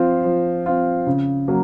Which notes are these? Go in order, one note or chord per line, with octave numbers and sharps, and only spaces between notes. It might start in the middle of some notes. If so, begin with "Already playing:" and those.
Already playing: F3 C4 F4
F3
C4 F4
C#3
F#3 A#3